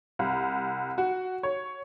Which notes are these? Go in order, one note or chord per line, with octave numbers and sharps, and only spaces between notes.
C2
F#4
C#5